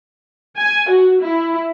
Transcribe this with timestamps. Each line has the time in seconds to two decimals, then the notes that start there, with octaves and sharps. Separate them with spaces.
0.57 G#5
0.89 F#4
1.21 E4